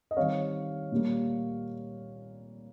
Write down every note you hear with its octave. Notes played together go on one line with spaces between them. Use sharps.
D#5
D#3 G3 C4 C#5 F5
A#2 G3 A#3